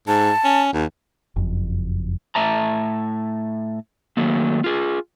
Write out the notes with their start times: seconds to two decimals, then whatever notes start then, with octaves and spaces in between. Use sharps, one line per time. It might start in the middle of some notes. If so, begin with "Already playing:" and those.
0.08 G#2 A5
0.44 C#4
0.73 D#2
1.36 F#1 F2
2.35 A2 E5 A5 A#5
4.17 D#3 F#3 A3 A#3
4.64 F4 G#4